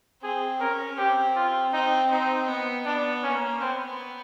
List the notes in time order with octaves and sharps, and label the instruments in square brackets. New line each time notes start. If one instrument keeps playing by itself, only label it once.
[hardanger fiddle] C4 [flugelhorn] G#4
[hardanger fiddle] C#4 [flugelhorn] A#4
[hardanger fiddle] C4 [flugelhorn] G4
[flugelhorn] F4
[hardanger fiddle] C4 [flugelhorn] D#4
[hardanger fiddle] C4 [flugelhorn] D#4
[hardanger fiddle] B3
[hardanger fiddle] B3 [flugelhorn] D4
[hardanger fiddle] A#3 [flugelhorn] C#4
[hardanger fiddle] B3 [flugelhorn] C4